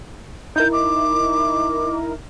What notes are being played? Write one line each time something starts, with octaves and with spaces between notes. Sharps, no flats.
D#4 E4 A#4 G6
D6